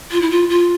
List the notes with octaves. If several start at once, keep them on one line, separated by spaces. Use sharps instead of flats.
F4
E4
F4
F4